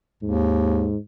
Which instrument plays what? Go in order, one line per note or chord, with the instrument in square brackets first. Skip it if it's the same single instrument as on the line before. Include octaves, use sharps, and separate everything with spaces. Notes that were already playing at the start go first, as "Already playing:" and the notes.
[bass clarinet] D#2 [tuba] G#2